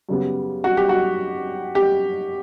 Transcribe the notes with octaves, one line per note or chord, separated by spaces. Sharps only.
F#2 C#3 G3 B3
F#4
G4
F#4
G4